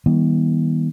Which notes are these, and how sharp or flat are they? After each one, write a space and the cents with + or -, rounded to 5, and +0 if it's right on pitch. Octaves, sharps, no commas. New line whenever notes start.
D#3 +35 G3 +0 B3 -40